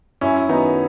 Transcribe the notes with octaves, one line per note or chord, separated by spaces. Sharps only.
F#2 C#4 E4
D#3 F#3 B3 D#4